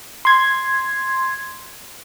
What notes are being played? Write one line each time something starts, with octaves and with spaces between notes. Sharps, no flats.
C6 G#6